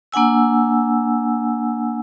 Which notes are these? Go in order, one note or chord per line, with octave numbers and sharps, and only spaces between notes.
A#3 D4 F#5 G#5 E6